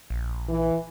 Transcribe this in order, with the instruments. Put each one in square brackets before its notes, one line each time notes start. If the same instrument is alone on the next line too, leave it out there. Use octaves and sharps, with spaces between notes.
[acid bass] A#1
[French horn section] E3